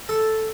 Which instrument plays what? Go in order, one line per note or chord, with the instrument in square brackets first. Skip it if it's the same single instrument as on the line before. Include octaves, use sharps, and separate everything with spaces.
[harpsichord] A4